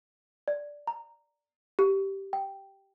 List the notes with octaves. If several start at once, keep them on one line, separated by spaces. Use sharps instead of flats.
D5
A#5
G4
G5